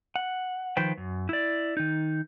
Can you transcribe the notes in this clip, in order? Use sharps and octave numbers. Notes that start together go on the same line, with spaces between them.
F#5
D#3 F3 B4 C5 G5
F#2
E4 D5
D#3 D#4